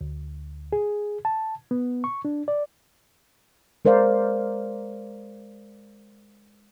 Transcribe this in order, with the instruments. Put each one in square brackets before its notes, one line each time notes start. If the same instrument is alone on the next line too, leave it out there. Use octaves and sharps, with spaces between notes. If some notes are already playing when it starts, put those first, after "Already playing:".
[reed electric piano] D2
G#4
A5
B3
C#6
D4
D5
[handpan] G#3 A#4 C5 D5 F5